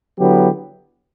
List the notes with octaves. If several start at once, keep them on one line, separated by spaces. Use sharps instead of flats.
D3 F#3 B3 E4 G4